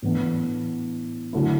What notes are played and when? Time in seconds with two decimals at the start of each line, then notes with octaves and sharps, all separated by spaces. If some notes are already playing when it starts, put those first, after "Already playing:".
0.02 A2 E3 B3 D4
1.33 D3 F#3 A3 E4